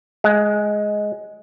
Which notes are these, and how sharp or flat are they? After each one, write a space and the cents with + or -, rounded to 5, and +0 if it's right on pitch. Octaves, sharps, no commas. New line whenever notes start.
G#3 +5